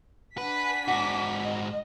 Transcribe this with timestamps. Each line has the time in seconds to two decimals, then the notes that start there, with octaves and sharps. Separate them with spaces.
0.38 D4 B4 F#5 G#5 B6
0.88 G#2 F#4 F#5 D6
1.43 D#5